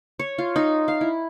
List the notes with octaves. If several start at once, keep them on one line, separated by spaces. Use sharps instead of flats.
C#5
F4
D#4
F5
E4